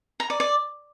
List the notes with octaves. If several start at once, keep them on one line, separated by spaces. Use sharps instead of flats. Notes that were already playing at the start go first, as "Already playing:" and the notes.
A#5
D5
D5